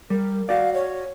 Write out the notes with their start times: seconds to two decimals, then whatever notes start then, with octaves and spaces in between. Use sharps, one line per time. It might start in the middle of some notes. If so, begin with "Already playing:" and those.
0.10 G3 A#4
0.49 F#4 D5 F5
0.74 C#5